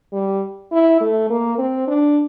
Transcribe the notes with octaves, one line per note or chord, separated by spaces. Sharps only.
G3
E4
A3
A#3
C4
D4